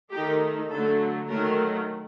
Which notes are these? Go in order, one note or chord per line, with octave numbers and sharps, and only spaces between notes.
D#3 A3 D#4 G4
D3 F#3 A3 A4
D#3 F#3 A3 A#4